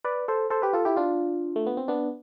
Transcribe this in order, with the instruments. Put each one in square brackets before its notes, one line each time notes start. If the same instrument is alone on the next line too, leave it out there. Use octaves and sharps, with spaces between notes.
[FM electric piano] B4 D5
A4 C5
A4 C5
G4 B4
F4 A4
E4 G4
D4 F4
A3
B3
C4
B3 D4